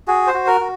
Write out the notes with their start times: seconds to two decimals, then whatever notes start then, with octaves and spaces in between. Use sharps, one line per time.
0.07 F#4 G#4
0.27 C5
0.34 F#4
0.47 A#4
0.61 F#4